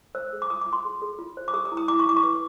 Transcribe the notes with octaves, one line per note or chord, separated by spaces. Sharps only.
C5 E6
G#4
D6
F4 D#6
D6
F4
C6
G#4
G#4
F4
C5
D6
G4 D#6
D#6
E4
D#6
E4 D6
C#6
E4 D6
C#6
B4 D6